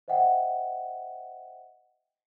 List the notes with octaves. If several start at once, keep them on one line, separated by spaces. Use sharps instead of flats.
C5 D#5 E5 F#5 G5